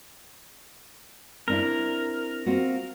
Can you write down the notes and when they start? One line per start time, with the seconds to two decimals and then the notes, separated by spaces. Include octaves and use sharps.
1.48 C4 D4 E4 A#4
2.46 C4 F4 F#4